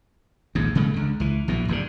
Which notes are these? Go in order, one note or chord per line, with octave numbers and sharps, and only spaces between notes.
A#1 D#2 G#2
A#2 C#3 G#3 A3
C#2 D3
C#2 E3
A#1 B2 E3
F1 G2 A#2 D3